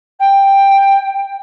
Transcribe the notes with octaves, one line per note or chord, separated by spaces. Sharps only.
G5